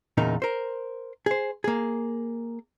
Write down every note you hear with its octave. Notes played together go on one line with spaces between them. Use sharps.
E2 A#2 C#3 D#4 A#4
A#4 C5
G#4 C5
A#3 G#4